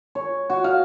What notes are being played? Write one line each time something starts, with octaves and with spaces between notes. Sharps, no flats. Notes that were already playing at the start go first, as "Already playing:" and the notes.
C#5
F#4
F5